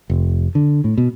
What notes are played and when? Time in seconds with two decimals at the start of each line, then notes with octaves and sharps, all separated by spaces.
0.10 F1
0.55 D3
0.84 A2
0.98 B2